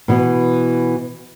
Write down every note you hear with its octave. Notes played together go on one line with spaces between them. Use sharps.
B2 E3 B3